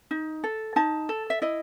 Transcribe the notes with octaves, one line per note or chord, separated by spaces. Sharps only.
D#4
A4
D#4 A5
A4
E5
E4 D#5